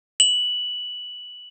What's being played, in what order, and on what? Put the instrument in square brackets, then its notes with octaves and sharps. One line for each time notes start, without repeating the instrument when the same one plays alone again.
[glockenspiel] F#7